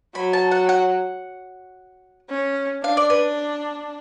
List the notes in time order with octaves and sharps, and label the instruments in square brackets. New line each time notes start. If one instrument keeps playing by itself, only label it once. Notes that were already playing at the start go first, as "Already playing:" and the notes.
[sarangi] F#3 [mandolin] B5
[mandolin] A5
F#5
F#5
[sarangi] C#4
[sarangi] D4 [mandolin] F5
[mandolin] D5
B4